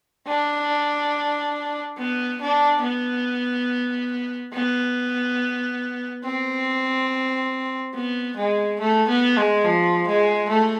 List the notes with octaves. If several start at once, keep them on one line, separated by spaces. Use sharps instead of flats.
D4
B3
D4
B3
B3
C4
B3
G#3
A3
B3
G#3
F3
G#3
A3